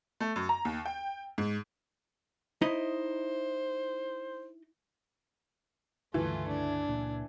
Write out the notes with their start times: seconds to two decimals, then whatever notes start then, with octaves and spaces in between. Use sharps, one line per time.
0.20 A3
0.36 F#2
0.49 A#5
0.65 D#2
0.86 G5
1.38 G#2
2.62 D#4 E4 C5 D#5
6.14 C#2 G2 D3 E3 A3 F4
6.48 D4
6.88 C#2 A#2